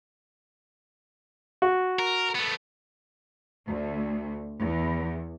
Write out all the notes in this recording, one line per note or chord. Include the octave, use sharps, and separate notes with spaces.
F#4
A#4
A3 B3
D2
E2